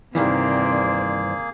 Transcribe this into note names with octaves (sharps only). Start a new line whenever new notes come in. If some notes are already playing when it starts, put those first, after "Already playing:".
G2 C3 D#3 E3 A#3 G#4 C5 D5